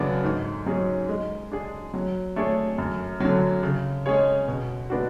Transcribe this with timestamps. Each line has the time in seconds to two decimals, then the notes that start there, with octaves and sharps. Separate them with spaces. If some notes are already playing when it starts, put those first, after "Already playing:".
Already playing: F#2 C#3 F#3 B3 D4
0.24 G#2
0.66 F#3 C#4 G#4
1.09 G#3
1.52 D4 G#4
1.94 F#3
2.36 A3 D4 G#4 C#5
2.78 F#2
3.20 D3 F#3
3.63 C#3
4.06 G#3 C#4 G#4 C#5
4.48 B2
4.90 G#3 B3 D4 F#4